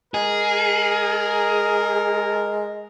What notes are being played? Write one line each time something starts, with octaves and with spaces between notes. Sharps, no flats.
G#3 G#4 A#4